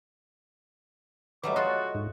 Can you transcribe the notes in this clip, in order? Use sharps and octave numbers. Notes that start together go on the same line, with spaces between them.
F#3 G3 A3 B4 D#5 E5 D6
F4 F#4 A4 D#5
G#2